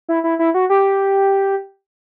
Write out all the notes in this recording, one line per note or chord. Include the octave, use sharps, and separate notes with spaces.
E4
E4
E4
F#4
G4